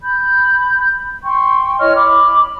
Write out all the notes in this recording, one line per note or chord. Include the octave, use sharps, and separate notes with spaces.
B5 G6
G5 C6 C#6
E4 C#5 D#5 F6
B5 D6